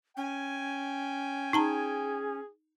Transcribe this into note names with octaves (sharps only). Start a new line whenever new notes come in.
C#4 G5 G#5
D#4 G#4 A5 A#5